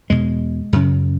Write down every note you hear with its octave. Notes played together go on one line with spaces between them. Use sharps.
E2 B2 G#3
F#2 C#3